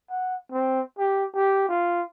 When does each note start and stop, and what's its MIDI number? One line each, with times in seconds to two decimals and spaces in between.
0.10 0.36 78
0.52 0.81 60
0.98 1.25 67
1.35 1.67 67
1.69 2.03 65